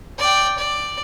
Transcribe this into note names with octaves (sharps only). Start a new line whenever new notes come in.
D5 G5
D5